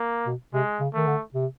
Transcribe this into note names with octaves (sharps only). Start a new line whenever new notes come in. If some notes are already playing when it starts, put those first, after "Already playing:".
Already playing: A#3
B2
C3 G#3
C#3
D#3 A3
D3
C3